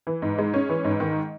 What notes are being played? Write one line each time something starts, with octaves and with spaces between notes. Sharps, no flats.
E3
G#2
G#3
C#4
E3
G#2
D#3